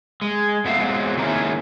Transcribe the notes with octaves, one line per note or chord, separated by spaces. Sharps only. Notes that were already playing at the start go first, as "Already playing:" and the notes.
G#3
A#2 B3 A4 E5 F5
F#3 G#3 B3 C4
D#3 G#3 A#3 B3 C#4 E4